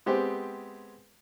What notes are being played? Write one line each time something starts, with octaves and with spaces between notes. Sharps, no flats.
G#3 B3 C4 G4